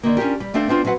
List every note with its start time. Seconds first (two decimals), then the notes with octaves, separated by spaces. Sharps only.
0.03 D3 D#3 A#3
0.17 C#4 D4 F4 G4 A#4
0.40 G3
0.54 A3 C4 D4 A4 F5
0.68 B3 C4 D4 F4
0.85 F#3 C4 B4 F5 F#5